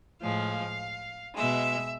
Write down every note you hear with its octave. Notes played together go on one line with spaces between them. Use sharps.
A2 F3 G#3 F5
B2 G#3 E5